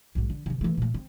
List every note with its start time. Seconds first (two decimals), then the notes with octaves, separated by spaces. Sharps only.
0.15 B1 G#2
0.30 D3
0.46 C3 D#3
0.61 E3 A3
0.77 A#2 A3
0.94 C4